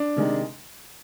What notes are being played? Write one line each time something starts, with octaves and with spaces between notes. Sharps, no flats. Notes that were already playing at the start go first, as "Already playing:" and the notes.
Already playing: D4
C3 D#3 G#3